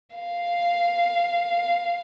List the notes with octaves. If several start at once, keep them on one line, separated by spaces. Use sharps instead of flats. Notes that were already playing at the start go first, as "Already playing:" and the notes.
F5